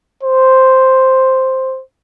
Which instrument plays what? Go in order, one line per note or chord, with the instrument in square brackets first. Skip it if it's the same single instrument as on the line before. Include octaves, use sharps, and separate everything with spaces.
[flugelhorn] C5